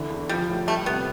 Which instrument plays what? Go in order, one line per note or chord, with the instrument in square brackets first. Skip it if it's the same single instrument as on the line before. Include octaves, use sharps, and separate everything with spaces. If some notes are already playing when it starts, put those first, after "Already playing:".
Already playing: [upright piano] D3 E3
E2
[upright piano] F3 [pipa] G3
[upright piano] A2
[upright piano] G3 [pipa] A3
[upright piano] C3 [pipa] B3